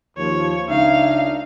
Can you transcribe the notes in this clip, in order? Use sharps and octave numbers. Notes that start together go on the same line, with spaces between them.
D#2 F3 C#5
C#2 D4 D#4 E5 F5